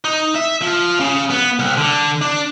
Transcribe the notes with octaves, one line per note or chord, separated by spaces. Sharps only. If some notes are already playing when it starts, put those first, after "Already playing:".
D#4
E5
F3
C#3
B3
C2
D3
D4